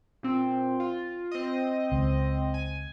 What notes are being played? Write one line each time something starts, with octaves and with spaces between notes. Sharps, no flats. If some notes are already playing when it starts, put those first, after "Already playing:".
A#2 C4
F4
C4 D#5
C#2
G#5